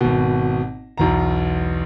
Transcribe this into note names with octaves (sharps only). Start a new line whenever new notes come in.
G#1 B2
B1 E2 A#5